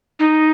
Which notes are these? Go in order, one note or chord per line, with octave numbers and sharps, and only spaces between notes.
D#4